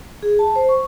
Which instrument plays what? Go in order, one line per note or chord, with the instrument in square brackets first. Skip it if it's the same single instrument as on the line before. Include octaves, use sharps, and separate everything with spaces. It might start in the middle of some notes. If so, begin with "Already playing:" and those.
[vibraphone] G#4
A5
C5
C#6